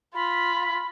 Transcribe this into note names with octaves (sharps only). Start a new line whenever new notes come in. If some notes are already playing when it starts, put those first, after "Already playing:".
F4 B5